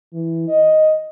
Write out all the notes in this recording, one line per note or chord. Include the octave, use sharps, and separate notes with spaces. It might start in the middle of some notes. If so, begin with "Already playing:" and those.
E3
D#5